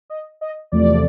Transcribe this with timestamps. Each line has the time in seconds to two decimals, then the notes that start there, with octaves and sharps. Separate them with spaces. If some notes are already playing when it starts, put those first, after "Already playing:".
0.10 D#5
0.41 D#5
0.72 E2 C3 F3 A3 D5